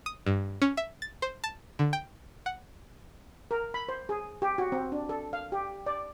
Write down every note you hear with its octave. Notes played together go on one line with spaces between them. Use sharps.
D#6
G2
C#4
E5
A6
C5
A5
D3
G5
F#5
A#4
B5
C5
G#4
G4
F#4
C4
D4
A4
F5
G4
D5